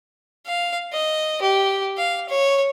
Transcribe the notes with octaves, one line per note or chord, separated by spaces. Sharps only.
F5
D#5
G4
F5
C#5